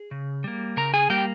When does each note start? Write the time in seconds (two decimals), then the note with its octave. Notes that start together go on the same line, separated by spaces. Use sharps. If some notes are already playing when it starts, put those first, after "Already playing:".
Already playing: G#4
0.11 C#3
0.44 G3 A#3
0.77 C#3 A#4 A#5
0.94 G#4 G#5
1.10 G3 A#3 G4 G5